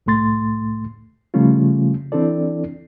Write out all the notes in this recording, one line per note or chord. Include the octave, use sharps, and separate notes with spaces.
C2 A2 A3 C6 A6
C#3 F3 G3 A3 C#4 F4
E3 C4 D4 E4 A4 D5